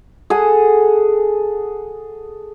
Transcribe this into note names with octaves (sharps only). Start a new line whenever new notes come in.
G#4 A4 F#5